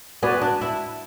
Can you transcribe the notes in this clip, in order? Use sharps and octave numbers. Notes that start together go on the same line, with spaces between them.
B3 F#4 B4 D5 G#5
D4
E4